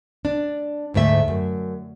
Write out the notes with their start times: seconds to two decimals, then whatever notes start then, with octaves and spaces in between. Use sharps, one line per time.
0.25 D4
0.94 D2 G#2 A3 E5
1.28 F#2